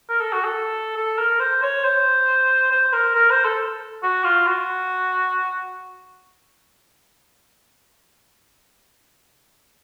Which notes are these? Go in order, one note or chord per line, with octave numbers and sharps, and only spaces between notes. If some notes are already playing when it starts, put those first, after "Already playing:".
A#4
A4
F#4
A4
A4
A#4
C5
C#5
C5
C5
A#4
A#4
C5
A4
F#4
F4
F#4